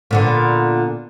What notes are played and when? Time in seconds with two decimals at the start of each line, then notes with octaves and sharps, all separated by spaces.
0.11 A#2 D3 B3